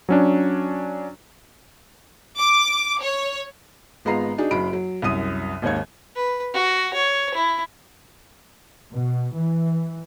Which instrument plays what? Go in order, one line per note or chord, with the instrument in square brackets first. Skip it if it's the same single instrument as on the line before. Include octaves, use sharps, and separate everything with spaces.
[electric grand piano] F#3 C#4 D4
[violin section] D6
C#5
[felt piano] G#1 G#3 B3 F4 A#5 C7
D4 D#4 F#4 G#4
F#1 F#2 F#4 B5 D7
F#3
C2 F#2 D#6 D#7
G#1 D#2 D#3 C#5 G#6
[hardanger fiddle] B4
F#4
C#5
E4
[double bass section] B2
E3